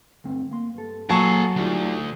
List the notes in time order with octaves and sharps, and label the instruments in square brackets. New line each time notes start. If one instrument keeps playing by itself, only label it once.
[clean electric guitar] D2 G2 C4
A#3 C6
G2 A4
[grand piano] F#3 A5 C#6 [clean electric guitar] A#3 F5 G#5 [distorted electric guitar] G#4 A4
[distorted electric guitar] D2 [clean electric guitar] G3 D#4 F4